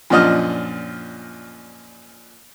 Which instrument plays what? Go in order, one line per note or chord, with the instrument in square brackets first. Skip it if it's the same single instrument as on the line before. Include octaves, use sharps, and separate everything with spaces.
[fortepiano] F#2 A#2 F3 D4 D#5 F6